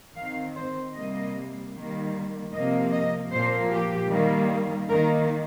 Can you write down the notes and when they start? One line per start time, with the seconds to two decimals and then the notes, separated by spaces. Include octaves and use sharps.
0.17 D#3 C4 F5
0.56 C5
0.96 C3 G3 A#3 D#5
1.74 D#3 G3 A#3
2.53 C3 F3 A#3 D#5
2.92 D#5
3.32 A#2 F3 A#3 C5
3.71 G4
4.10 D#3 G3 A#3
4.89 D#3 A#3 A#4